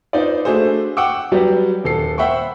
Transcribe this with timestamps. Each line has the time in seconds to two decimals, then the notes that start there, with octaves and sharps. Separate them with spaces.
0.13 D#4 F4 B4 C5 D5
0.45 A3 D4 F#4 G#4 C5
0.97 F#5 G5 C#6 D6 E6
1.32 F#3 G3 F#4 G4 B4 D5
1.84 D#1 A4 C7
2.18 C5 E5 F#5 G5 B5 C#6